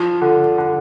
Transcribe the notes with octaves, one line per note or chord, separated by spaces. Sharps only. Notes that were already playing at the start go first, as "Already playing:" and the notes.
Already playing: F3
D3
D3